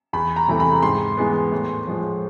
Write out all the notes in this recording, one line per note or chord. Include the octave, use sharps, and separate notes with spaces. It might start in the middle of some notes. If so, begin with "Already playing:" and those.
E2 B5
A#5
C3 E3 A3
B5
G#2 C6
E3 G#3 B3
A2
F3 G#3